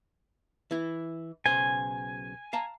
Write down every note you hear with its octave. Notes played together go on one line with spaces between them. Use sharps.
E3 E4
B1 C#3 C5 G#5
F5 A5 A#5